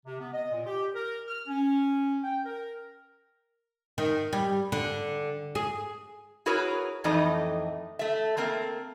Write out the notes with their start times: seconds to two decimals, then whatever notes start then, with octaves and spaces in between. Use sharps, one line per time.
0.06 C3
0.20 B3
0.33 D#5
0.51 A#2
0.66 G4
0.94 A#4
1.28 F6
1.47 C#4
2.23 G5
2.45 A#4
3.98 D#3
4.33 G3
4.72 D3
5.55 G#4
6.46 E4 F#4 G#4 A#4 B4 C#5
7.04 F2 A2 E3 A3 D#4 D#5
7.99 A3 E5
8.37 A3 A#3 C4 A#4